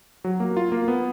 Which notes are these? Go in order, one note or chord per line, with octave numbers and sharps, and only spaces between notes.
F#3
A#3
F4
A#3
B3